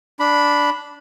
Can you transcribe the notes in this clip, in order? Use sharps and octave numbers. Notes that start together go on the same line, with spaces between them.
D4 B5